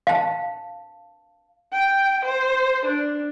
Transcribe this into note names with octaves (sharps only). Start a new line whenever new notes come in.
F5 A5
G5
C5
D4